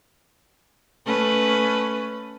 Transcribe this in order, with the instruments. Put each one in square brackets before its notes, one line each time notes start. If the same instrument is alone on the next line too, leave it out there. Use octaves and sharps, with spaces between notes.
[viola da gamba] A3 C#4 B4